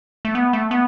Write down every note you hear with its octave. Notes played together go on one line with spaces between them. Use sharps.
A3
B3
A3
B3